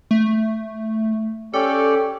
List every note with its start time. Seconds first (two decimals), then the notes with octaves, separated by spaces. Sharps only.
0.11 A3
1.54 C#4 G4 A4 D5